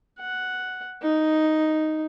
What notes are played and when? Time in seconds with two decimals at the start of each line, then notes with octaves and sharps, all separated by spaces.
0.19 F#5
1.02 D#4